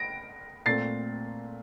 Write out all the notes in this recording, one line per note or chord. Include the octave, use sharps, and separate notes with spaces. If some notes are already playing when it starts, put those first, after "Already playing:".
Already playing: A#6 D7
A#2 A3 C4 A6 C7